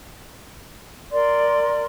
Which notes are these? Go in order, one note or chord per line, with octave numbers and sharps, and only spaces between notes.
A#4 D5 C6